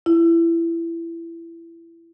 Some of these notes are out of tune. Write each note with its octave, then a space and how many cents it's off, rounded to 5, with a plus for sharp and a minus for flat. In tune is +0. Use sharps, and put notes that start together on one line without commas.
E4 +20